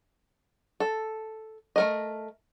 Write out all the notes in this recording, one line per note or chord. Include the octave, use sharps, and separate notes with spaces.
A4
A3 A#4 D#5